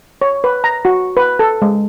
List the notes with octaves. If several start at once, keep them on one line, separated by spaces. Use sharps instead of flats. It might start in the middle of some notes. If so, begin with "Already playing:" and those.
C#5
B4
A#5
F#4
B4
A4
G#3